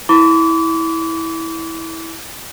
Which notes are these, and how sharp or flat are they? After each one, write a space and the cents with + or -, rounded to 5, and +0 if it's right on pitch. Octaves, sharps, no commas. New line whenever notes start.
E4 -15 B5 +40 D6 -35